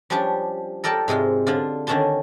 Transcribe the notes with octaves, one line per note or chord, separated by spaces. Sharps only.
F3 G3 C#4 D4 G4
A4 A#4 D5 G5 A5
G#2 C3 G#3 F4
D3 D4 F4
D3 D#3 C#4 D4 A5 C6